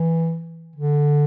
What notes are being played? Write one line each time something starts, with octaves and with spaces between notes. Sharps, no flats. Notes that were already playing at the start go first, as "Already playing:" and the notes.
Already playing: E3
D3